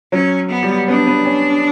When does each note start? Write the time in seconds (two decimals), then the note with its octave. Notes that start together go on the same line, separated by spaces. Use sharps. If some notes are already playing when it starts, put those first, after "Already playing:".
0.12 F#3 C#4
0.50 B3
0.63 G3
0.88 B3 D4
1.07 B3
1.25 C#4